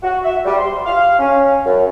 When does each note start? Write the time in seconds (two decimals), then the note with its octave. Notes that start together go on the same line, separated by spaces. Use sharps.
0.03 F#4
0.23 E5
0.45 G3
0.58 C6
0.86 F5
1.19 C#4
1.66 F#2